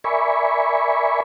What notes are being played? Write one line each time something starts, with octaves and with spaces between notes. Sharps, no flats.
A#4 D5 E5 G#5 B5 C#6